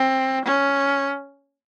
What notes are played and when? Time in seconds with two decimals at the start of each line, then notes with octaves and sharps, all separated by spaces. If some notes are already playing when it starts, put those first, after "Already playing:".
Already playing: C4
0.45 C#4